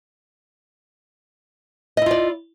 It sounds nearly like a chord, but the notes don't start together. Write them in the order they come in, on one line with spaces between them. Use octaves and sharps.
D#5 E4 F4 D5